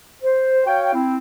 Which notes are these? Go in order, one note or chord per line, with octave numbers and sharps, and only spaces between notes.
C5
F#4 C#5 F5 G5
C4 E4